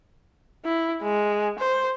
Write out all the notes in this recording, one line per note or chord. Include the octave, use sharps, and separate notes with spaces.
E4
G#3
C5